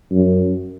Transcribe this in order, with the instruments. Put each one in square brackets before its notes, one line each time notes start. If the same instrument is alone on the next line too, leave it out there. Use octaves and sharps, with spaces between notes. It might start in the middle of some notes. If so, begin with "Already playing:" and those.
[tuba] F#2